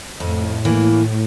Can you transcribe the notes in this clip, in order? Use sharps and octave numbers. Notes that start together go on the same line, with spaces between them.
F2 A2
E3 A#3